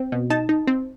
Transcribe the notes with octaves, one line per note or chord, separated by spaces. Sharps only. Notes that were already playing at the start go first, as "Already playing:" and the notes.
Already playing: C4
B2
D#4 A5
D#4
C4